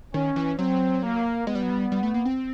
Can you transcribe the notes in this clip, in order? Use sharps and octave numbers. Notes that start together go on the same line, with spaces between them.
D#3 C#4
E3
F#3 C4
A#3
G#3 B3
G3
F#3
G3
G3
A3
A#3
C4